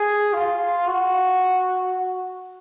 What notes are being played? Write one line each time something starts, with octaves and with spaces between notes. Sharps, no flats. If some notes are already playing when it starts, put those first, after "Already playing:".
Already playing: G#4
F4
F#4